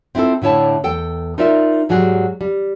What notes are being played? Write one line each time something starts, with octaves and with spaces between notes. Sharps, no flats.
C4 E4 F4 G4 A4
A2 D3 E4 C#5 A5
E2 A4 G5
D#4 F4 A#4 D5 E5
G#2 F#3 G3 F#4 G#4
G3